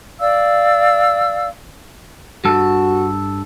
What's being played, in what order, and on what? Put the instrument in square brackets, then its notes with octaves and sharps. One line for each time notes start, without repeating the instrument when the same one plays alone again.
[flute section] D5 F5 E6
[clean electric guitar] G2 A4 [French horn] F#4